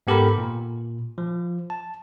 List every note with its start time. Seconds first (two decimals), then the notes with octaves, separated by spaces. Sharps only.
0.07 G#2 B3 G4 A4 A#4 B5
0.38 A#2
1.18 F3
1.70 A5